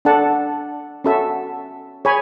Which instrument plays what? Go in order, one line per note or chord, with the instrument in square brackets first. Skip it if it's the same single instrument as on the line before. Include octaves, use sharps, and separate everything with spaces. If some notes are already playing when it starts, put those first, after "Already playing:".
[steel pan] D4 A4 D5 F#5 A5
C#4 F#4 A4 E5
G#4 C#5 G#5 B5